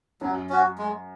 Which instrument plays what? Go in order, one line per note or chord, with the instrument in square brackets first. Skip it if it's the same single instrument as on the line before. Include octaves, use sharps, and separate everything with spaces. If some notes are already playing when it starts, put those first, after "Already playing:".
[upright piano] F#2 [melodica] F#3
[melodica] C#4 F#4
G#3